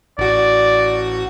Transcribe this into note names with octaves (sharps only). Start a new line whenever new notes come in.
A1 F#4 D5